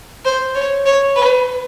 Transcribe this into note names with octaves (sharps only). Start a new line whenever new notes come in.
C5
C#5
C#5
B4